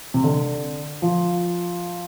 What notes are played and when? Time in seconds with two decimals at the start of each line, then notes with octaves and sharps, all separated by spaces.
0.14 C3
0.24 D3
1.02 F3